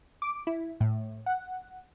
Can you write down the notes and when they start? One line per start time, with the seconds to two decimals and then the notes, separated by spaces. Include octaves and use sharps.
0.22 D6
0.47 E4
0.80 A2
1.26 F#5